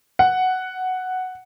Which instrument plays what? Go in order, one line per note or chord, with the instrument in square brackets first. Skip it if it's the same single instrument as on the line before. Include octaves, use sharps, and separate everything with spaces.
[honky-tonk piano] F#5